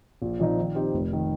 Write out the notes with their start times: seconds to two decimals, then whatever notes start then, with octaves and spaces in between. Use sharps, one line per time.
0.22 A#1
0.40 A#2 F3 C4 D#4
0.57 D#3
0.75 C4 D#4 G4 C5
0.94 F1
1.13 D#3